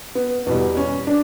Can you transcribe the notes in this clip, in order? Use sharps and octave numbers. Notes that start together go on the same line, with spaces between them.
B3
E2 B2 G3 B3
C#4
D4